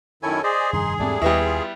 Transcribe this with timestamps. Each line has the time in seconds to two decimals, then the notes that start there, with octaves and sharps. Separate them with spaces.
0.23 F#2 D#3 E4 A4 C#5 G#5
0.44 G#4 C5 D5 D#5
0.73 F1 G2 D#3 D#4 C6
0.99 E2 G#2 G3 A3 C4 D4
1.22 D#2 G3 B3 E4 D#5 C#6
1.45 F4